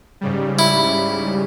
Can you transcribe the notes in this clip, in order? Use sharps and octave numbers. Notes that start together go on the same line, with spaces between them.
G#2 C#3 G3
E4